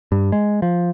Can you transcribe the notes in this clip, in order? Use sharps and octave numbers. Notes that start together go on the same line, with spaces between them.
G2
G#3
F3